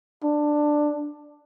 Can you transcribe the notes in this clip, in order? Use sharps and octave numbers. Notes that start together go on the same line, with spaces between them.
D4